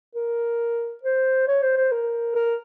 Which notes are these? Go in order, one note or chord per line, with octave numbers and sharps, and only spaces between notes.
A#4
C5
C#5
C5
C5
A#4
A#4